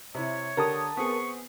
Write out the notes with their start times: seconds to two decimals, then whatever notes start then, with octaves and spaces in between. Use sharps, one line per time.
0.15 C3 E4 C#5
0.57 D3 G4 A#4 A5 D#6
0.97 B3 C4 G#4 C#6